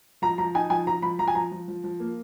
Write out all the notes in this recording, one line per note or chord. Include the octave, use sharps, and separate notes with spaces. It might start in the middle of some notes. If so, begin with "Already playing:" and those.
F3 A#5
F3 A#5
D#4 G#5
F3 G#5
F3 A#5
F3 B5
F3 A#5
G#5
F3 A#5
F3
F3
F3
A#3